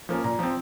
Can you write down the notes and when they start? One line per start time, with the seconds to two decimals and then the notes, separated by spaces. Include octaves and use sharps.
0.09 F3 A#3 C#4
0.24 A#2 A#5
0.39 F3 C4